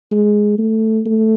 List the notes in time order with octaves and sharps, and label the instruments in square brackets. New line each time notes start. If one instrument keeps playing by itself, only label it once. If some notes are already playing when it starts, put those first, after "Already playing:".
[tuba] G#3
A3
A3